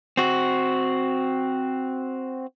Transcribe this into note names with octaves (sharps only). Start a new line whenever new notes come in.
C4 F#4